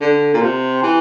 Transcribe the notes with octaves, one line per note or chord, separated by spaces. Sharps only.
D3
A#2
C3
E3